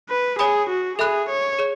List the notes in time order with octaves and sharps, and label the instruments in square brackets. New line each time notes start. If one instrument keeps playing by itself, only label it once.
[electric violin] B4
[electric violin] G#4 [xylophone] C#5 G#5 B5 D#6
[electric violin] F#4
[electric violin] G#4 [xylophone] A4 E5 B5 F#6
[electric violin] C#5
[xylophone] G#4 C#5